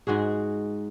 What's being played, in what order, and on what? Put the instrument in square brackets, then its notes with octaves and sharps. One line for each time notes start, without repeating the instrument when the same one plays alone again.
[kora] G#2 G#3 F#4 G#4